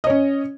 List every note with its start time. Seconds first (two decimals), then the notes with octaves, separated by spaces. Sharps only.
0.04 D#5
0.07 C#5
0.10 C#4